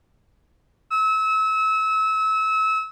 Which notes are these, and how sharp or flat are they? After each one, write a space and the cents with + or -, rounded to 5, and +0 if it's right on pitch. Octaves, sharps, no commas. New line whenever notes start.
E6 -30